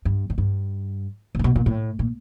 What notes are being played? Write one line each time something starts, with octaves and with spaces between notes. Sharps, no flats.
G2
G#2
G2
A2
A#2
B2
A#2
A2
A#2